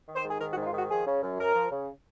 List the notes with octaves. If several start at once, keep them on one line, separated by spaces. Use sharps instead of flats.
D#3
C5
G#2
G#4
D#3 A#4
F#4
G#2 D#4
F4
D#3 F#4
F3 G#4
C#3
F#2
F#2 A#4
F3
C#3